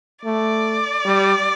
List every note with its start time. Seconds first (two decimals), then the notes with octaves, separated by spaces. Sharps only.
0.25 A3 D5
1.05 G3